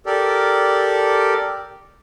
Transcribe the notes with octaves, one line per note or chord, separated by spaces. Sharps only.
G4 A4 A#4 D5